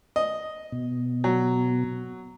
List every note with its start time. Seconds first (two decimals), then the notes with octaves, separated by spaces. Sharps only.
0.16 D#5
0.72 B2
1.24 F#3